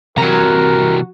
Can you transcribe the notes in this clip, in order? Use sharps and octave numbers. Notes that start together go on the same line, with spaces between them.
C3 E3 F#4 A#4 A#5